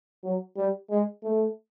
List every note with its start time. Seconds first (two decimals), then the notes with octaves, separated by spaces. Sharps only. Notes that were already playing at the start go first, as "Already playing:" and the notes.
0.23 F#3
0.56 G3
0.89 G#3
1.23 A3